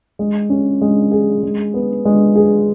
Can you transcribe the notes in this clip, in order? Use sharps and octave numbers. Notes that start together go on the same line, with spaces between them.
G#3
C#4
G#3
G#4
G#3
B3
G#3
G#4